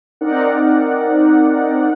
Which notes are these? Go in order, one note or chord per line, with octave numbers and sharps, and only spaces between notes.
C4 D#4 A#4 D5 F#5